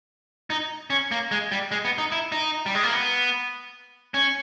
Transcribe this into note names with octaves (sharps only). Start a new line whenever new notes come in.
D#4
C#4
A#3
G#3
G3
G#3
B3
D#4
E4
D#4
G3
G#3
A#3
B3
C#4